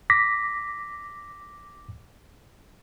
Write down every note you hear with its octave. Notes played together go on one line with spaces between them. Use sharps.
D6 A#6 B6